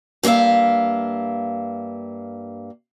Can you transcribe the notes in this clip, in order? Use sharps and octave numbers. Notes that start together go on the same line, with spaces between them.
G2 A#3 D#4 E5 F5